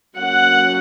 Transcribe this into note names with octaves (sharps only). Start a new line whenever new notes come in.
F#3 A#3 C#4 F#5